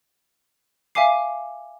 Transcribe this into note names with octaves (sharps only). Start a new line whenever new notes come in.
E5 F5 G#5 D6 C7